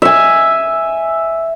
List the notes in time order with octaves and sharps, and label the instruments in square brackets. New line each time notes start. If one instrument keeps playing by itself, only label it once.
[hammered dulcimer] E5 G#5